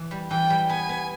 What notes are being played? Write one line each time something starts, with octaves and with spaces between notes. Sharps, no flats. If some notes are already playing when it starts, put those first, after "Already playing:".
Already playing: E3
G3
E3 G5
G3
B3 G#5
B3